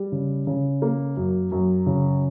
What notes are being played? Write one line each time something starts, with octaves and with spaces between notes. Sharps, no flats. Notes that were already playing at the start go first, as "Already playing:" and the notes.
Already playing: G3
C#3
C#3
A#3
F#2
F#2
C#3